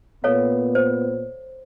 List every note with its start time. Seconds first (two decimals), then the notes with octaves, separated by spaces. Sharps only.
0.24 A#2 B3 A4 C#5 F5
0.75 C5